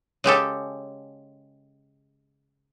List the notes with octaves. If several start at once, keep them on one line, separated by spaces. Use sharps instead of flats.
C#3 G#3 G4 A4